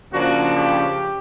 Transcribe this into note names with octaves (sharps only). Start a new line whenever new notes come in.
C#3 F3 A#3 D4 F#4
G4